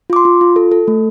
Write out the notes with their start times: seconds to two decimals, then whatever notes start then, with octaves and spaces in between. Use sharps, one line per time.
0.10 F4 D6
0.16 C6
0.25 F4
0.41 F4
0.56 A4
0.72 A4
0.88 A3